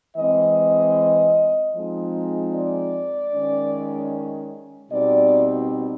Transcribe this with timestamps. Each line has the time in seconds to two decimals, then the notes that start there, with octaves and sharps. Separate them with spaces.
0.17 E3 G#3 C4 D#5
1.75 F3 G#3 C4 D#4
2.54 D5
3.33 D#3 G#3 C#4
4.91 B2 G3 C4 D#4 D5